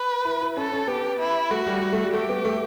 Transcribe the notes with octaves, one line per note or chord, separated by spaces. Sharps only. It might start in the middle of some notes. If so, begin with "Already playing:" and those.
Already playing: B4
E4
E4
C#4 A4
C#4
B3 G4
E4
A3 F#4
G3
G3
A3
G3
A3 G4
B3
A3